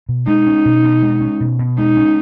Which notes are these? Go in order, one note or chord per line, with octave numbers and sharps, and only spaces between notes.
B2
G#3 D#4
C#4
B2
B2
G#3
C#4
B2
B2
G#3 D#4
C#4